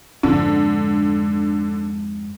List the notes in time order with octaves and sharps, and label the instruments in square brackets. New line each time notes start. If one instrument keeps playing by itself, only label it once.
[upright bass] F2 G#2 [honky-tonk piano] D3